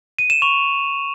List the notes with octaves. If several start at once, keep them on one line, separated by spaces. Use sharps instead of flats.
D#7
E7
C#6 F7